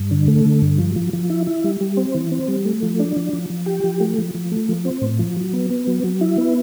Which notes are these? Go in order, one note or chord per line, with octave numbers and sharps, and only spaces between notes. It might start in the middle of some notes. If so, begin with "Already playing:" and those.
Already playing: G2
D3
A3
D3
G2
F3
F3
F3
E4
E4
G3
G3
C4
E3
C4
G3
A3
F3
D4
F3
F3
F3
G4
F3
A3
F3
F3
A3
F3
C4
A2
F3
F#3
B3
B3
F#3
F#3
E4
B3